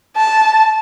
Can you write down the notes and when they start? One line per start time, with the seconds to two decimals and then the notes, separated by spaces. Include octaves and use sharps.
0.17 A5